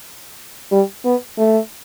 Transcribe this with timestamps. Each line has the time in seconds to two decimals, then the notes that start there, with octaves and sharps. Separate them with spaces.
0.72 G3
1.05 B3
1.38 A3